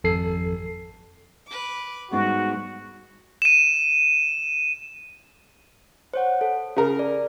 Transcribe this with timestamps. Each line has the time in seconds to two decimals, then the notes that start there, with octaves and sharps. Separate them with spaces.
0.04 G#1 F2 A4 C7
1.48 B4 D6
2.11 G#2 G3 G#3 B3 F#4
3.42 D#7 E7
6.14 C5 C#5 F#5
6.41 A4
6.76 C#3 A#4
6.99 D5